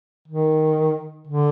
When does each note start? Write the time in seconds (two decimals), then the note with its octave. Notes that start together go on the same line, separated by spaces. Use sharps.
0.28 D#3
1.27 D3